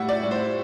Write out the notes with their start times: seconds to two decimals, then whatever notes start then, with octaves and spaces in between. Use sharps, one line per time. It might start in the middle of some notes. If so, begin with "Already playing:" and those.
Already playing: A2 G3 E5 F#5
0.09 D5
0.23 A2
0.31 C5